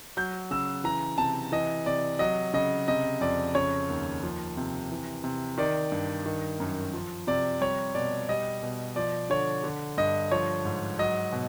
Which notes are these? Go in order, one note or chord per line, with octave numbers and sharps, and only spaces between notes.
F#3 G6
C#3 E6
E3 A#5
C3 A5
E3 D#5
C3 D5
F#3 D#5
C#3 D#5
C3 D#5
F2 D5
C#3 C#5
D#2
F3
C3
E3
C3
D#3 D5
G2
D#3
F#2
F3
C3 D5
G3 C#5
B2 D5
G3 D#5
B2
F3 D5
D3 C#5
D3
G2 D#5
F3 C#5
G#2
F#3 D#5
B2